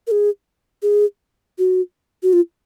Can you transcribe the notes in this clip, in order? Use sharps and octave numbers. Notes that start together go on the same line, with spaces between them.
A#4
G#4
G#4
F#4
F#4
F4